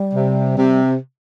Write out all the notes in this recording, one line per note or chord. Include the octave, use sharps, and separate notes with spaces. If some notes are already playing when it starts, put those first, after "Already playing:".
Already playing: G3
C3
C3